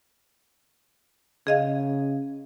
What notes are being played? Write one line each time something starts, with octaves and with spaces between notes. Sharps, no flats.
C#3 G#4 D#5 F5